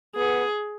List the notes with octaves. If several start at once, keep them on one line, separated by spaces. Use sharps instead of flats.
B3 G#4